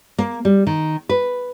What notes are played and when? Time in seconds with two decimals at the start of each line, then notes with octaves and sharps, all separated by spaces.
0.18 A#3
0.45 G3
0.67 D#3
1.09 B4